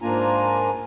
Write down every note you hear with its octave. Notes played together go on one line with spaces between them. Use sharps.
G#2 A#3 D4 F4 G#5 A#5